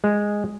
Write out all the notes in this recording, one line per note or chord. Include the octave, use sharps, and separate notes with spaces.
G#3